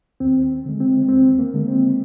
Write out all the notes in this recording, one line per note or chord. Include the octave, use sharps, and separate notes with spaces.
D#2 C4
D3 G#3
C4
D#2 C4
A#3
D3 G#3
C4